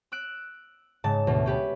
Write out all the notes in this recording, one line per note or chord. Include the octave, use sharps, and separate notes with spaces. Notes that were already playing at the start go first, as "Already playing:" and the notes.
E6 F#6 D7
G#2 C#3 A5 A6
D2 B2
C#4 G4 B4